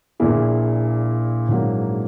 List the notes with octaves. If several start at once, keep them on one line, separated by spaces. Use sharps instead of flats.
A#1 A#2 A#3 E4 G#4
A#1 G#2 F#3 A#3